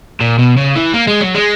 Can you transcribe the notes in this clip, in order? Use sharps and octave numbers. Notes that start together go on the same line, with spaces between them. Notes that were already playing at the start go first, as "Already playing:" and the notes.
A#2
B2
C#3
E3
A#3
G#3
F#3
G#3